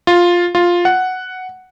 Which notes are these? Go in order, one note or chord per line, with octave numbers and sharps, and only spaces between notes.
F4
F4
F#5